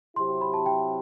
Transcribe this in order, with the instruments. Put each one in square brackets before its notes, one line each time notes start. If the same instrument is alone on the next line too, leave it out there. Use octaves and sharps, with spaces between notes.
[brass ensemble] C3 F#3 C4 E4 G4 [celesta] C6
[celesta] B5
A5
G5